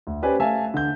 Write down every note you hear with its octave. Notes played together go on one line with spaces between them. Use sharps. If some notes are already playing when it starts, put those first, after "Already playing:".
D2
C#4 G4 B4 C5 D5 G#5
A3 E5 F5 G#5 A5
D3 G6